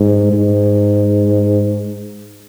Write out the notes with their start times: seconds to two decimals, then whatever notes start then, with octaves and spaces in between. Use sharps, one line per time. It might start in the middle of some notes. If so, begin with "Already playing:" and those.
Already playing: G#2
0.33 G#2